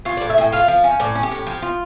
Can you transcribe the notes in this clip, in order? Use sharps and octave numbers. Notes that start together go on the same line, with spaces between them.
F4 C#5
D5
A2
E5
A2 G5
F4 F5
F3
C#4
A2 D5
C#4
G4
A2
F3
F4